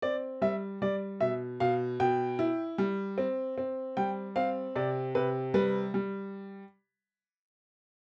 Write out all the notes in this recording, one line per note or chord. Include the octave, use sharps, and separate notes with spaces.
C4 D5
G3 E5
G3 D5
B2 E5
B2 F5
B2 G5
E4
G3
C4
C4
G3 G5
C4 F5
C3 D5
C3 B4
G3 B4
G3